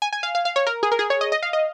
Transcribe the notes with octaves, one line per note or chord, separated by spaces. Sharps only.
G#5
G#5
F5
F5
F5
C#5
A#4
G#4
A#4
G#4
C#5
D#5
D#5
F5
D#5